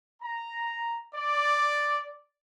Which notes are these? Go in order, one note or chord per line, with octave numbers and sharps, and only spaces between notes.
A#5
D5